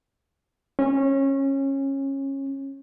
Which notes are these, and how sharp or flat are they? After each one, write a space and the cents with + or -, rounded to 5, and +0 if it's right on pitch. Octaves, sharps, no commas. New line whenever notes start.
C#4 -20